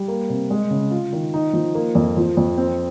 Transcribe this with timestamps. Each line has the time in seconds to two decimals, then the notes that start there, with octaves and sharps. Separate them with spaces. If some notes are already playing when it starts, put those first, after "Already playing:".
Already playing: G3
0.08 A#3
0.30 C3
0.50 G#3
0.71 C#3
0.91 F4
1.13 D#3
1.34 D#4
1.53 F3
1.75 A#3
1.95 F2
2.17 F3
2.37 F2
2.58 C4